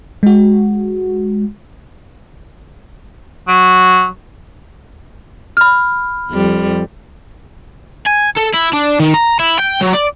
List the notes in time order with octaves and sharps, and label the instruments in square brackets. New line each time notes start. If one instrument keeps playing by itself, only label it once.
[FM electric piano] G#3 F#4
[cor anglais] F#3
[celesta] B5 F6
[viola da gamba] F2 G3
[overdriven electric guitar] G#5
A4
E4
D4
D#3
A#5
E4
G5
F#3
D5